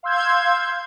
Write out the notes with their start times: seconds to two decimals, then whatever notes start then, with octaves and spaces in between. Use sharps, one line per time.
0.03 F5 C6 E6 G6 G#6